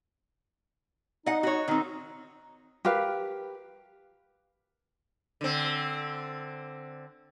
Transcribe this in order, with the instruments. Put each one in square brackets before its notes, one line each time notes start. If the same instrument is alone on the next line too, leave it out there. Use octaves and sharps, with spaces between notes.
[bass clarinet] D#4 [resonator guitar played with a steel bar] D#5 F#5
[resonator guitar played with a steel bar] F#4 C#5
[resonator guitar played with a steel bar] D#3 C4 [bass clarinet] D#4
[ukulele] G4 A#4 B4 F5
[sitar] D3 C4